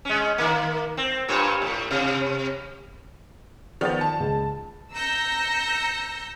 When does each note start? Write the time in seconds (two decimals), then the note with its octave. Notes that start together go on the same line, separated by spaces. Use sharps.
0.05 G#3 C#4
0.38 D#3 A#3
0.97 C4
1.28 G2 A#2 C#5
1.62 A2
1.91 C3
3.81 D#3 F3 B3 D5 G5 A6
4.01 A5
4.20 C#2
4.93 A#5 E6 G6 A#6 C#7